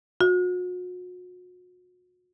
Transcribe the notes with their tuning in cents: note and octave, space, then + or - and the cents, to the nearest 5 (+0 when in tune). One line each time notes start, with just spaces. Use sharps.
F#4 -40